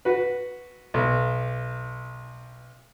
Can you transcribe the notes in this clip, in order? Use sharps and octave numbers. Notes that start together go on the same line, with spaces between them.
F#4 B4
B1